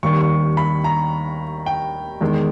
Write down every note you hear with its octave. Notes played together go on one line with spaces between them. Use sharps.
D#2 D#3 G3 C#6
C#6
B5
A#5
G5
E2 D#3 G#3